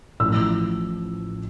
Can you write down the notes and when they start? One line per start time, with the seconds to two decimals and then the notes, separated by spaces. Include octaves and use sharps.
0.20 A1 A2 F3 E6